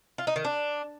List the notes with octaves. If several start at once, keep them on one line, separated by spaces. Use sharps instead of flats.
F4
D#4
D#3
D4